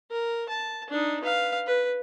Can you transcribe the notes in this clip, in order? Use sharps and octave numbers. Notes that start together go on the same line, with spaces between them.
A#4
A5
D4 D#4
B4 F5
B4